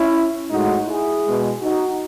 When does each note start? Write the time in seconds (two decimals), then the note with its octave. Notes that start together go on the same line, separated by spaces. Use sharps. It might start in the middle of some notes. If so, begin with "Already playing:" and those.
Already playing: C#4 E4
0.51 A2 G#3 D#4 F#4
0.87 E4 G#4
1.24 B2 G#3
1.61 D#4 F#4